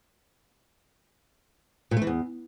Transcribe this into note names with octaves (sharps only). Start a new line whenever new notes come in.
A#2
A3
E3
E2